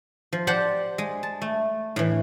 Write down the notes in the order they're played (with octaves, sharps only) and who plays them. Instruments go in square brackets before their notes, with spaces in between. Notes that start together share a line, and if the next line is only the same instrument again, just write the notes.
[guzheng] F3
G4 C5 D5 F#5 A5
G#3
A5
A3
A2 E3